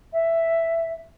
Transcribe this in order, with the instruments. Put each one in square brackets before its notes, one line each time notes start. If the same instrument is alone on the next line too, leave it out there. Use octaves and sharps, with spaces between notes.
[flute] E5